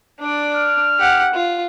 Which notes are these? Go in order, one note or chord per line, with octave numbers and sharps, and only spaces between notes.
D4 D5
F6
G4 F#5
F4